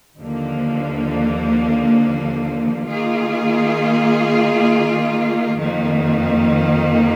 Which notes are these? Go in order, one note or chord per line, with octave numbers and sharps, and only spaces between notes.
D#2 D3 F3 A#3
D#3 A#3 F4 G#4
F2 D#3 A#3